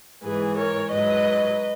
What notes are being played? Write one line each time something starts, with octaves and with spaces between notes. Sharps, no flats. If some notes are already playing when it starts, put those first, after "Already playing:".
G#2 E3 G#4 B4
A#4 C#5
G#2 F#3 B4 D#5